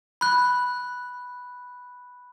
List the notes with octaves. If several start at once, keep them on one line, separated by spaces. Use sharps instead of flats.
B5 F#6